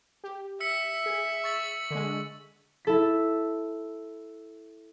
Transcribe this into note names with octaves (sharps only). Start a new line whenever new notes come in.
G4
E5 E6 B6 C#7
G#4
C#6 A6 F#7
D3 G#3
E4 A4 B6